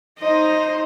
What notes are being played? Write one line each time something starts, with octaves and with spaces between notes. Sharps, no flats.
D#4 C5 D#5